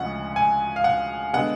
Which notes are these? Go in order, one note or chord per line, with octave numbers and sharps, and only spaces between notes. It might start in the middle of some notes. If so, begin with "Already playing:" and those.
Already playing: D2 C#3 F3 G#3 F#5
G#5
F5
F#5
D3 G#3 B3 F#5